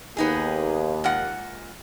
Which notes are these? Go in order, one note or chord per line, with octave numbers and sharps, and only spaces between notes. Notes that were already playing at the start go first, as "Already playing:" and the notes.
D#2 B3 D#4 G#4
A#2 G#3 F#5